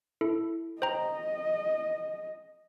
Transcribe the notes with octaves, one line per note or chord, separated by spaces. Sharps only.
E4 A4
C5 D#5 G5 A#5